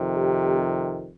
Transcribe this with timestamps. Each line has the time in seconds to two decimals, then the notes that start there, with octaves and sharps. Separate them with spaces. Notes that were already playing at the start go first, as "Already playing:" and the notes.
Already playing: F2 C3 D#3
0.16 G4